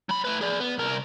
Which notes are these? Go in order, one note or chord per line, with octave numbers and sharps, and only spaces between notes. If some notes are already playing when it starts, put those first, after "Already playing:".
F#3 B5
A3 B4
G#4 D5
B3
C2 A#4